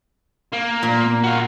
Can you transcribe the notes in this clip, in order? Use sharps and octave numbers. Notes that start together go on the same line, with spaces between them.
A#3
A#2
F#4 F5